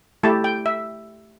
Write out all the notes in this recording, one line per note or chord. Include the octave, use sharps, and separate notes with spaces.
A3 E4 G4 A5
G5
E5